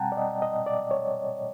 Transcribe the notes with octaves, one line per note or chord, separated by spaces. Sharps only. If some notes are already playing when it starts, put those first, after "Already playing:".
Already playing: B2 G3 C4 F#5 G5 A5 A#5
D5
D#5
D#5
D5
C#5